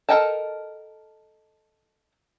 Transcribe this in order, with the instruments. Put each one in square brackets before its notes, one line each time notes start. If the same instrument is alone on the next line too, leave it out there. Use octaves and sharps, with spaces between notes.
[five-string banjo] A4 A#4 D#5 G5 A5